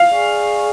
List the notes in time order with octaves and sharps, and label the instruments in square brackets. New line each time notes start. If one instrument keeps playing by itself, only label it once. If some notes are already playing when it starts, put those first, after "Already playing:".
Already playing: [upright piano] F5
[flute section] G#4 D5 G#5 C#6